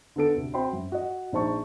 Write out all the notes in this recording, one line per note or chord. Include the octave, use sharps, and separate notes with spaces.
D3 B3 A4 D7
D2 C3
C4 F#4 G5 B5 C6
F#2
F#4 D#5
A#1 D#4 C5 A5 C#6